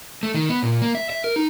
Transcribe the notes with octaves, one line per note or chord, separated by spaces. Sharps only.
A3
D#3
B3
A#2
A#3
E5
E5
A#4
D#4